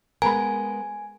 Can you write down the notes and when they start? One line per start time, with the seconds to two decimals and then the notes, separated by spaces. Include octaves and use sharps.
0.22 G#3 B3 A#4 G#5 A#5 B5